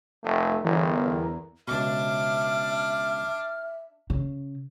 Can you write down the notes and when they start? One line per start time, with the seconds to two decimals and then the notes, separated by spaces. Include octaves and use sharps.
0.24 F1 A3
0.64 G1 E2 A#4
1.68 C#2 B2 D4 E5 D6 F6
4.10 C#3